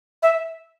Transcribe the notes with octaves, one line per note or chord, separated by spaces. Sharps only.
E5